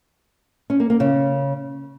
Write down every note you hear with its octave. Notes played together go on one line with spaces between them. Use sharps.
C#4
A#3
A#3
C#3